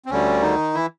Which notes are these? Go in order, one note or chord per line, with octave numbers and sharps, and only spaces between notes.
C4
D2 D3 G3 C#4
D#3 D#4
E3 E4